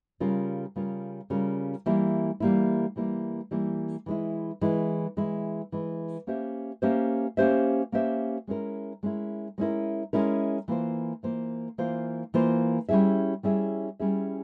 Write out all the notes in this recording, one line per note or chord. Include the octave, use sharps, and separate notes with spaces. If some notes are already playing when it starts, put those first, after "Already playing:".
C#3 G3 C#4 F4 A#4
C#3 G3 C#4 F4 A#4
C#3 G3 C#4 F4 A#4
E3 G3 A#3 E4
E3 G3 A#3 E4
E3 G3 A#3 E4
E3 G3 A#3 E4
E3 G#3 E4
E3 G#3 E4
E3 G#3 E4
E3 G#3 E4
A#3 C#4 G4 C5 E5
A#3 C#4 G4 C5 E5
A#3 C#4 G4 C5 E5
A#3 C#4 G4 C5 E5
G#3 C#4 E4 A#4
G#3 C#4 E4 A#4
G#3 C#4 E4 A#4
G#3 C#4 E4 A#4
E3 A#3 F4 C5
E3 A#3 F4 C5
E3 A#3 F4 C5
E3 A#3 F4 C5
G3 C#4 E4 G#4 E5
G3 C#4 E4 G#4 E5
G3 C#4 E4 G#4 E5